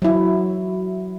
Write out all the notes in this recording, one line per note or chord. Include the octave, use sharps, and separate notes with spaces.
F#3 E4